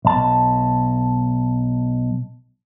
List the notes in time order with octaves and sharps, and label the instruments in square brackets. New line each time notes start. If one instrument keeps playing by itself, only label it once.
[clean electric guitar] B1 A5